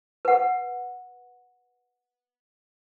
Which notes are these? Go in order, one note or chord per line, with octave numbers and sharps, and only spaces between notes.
B4 F#5